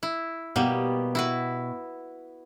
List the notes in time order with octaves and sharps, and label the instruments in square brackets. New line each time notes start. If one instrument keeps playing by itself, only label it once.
[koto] E4
[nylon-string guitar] B2 G4 [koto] G3 A#3 B3
[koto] E4 F#4 B4